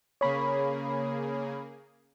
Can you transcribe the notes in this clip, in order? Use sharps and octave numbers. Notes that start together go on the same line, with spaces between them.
C#3 A#3 G#4 C#5 B5